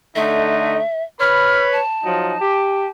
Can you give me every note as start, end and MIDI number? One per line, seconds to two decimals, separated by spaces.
0.16 0.79 50
0.16 0.79 57
0.16 0.79 63
0.16 1.03 76
1.20 1.78 71
1.20 1.78 73
1.20 1.78 83
1.20 1.61 89
1.73 2.89 81
2.04 2.34 53
2.04 2.34 54
2.04 2.34 63
2.41 2.87 67